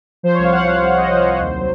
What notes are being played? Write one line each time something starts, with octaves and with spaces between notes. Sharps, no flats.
F3 C5
C2 C#5
F5
F3 F#5
C2 F5
C2
C2 D#5
F3 C5
C2
D#2
F#3